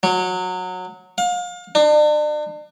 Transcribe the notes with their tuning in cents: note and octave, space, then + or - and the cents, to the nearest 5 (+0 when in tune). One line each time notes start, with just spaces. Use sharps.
F#3 -15
F5 +35
D4 +40